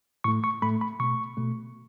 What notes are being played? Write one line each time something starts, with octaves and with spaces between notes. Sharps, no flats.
A2 A3 C#6
C#6
A2 A3 B5
B5
B2 A3 C#6
B2 A3